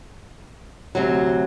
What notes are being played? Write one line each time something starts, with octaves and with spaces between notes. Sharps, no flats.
D2 C3 F#3